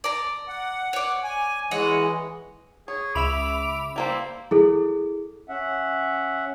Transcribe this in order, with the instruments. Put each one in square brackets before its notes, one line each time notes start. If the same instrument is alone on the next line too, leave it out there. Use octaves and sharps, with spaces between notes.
[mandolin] D5 A#5
[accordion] F#5
[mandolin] C#5 D5
[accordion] G#5
[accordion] E3 G#3 [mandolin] C#5 D#5 F#5
[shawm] G#4 [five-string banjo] C#5
[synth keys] C#2 E5 E6 [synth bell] B5 F7 [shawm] D6
[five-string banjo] G3 A#3 C5 [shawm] E4
[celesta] E4 G#4 A4
[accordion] C#4 E5 F#5